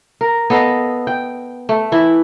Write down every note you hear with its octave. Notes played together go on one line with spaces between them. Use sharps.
A#4
B3 A4 D#5 F5
G5
A3
E3 E4